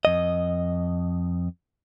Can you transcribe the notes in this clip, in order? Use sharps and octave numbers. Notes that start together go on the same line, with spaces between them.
F2 D#5